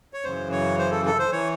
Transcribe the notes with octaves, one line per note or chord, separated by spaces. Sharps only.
C#5
F#2 C#3 E3 C5
C#5
C5
A4
A4
C5
E3 C#5